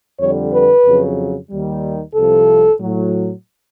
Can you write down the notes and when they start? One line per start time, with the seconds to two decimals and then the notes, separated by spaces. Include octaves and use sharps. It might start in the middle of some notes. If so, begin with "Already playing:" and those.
0.19 F2 D3 G3 C#5
0.53 B4
0.85 F2 C#3 F#3
1.50 D#2 D#3 G3
2.15 C2 C3 F3 A4
2.79 A2 F#3